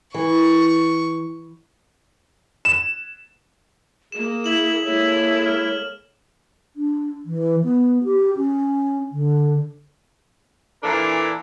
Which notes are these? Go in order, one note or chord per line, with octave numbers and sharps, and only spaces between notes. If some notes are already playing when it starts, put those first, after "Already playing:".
E3 C#6
E7
A#3 G#4 E7
E4 E7 F#7
G#3 A#3 E4 A4 C#5
F6
D4
E3
B3
G4
C#4
D3
A#2 E3 D4 A4 A#4